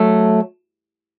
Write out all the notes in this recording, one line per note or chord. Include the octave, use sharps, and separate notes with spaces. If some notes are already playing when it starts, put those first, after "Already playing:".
Already playing: F#3 A3